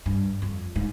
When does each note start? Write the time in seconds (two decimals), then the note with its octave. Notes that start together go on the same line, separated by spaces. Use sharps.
0.06 G2
0.42 F2
0.75 G#2